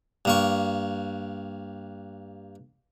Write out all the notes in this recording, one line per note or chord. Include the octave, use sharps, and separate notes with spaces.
G2 A#3 C#6